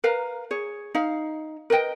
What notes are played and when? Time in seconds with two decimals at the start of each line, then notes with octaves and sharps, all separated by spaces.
0.04 A#4 B4 F5 A#5
0.51 G#4 C#5
0.95 D#4 F5
1.70 A#4 B4 D#5 G5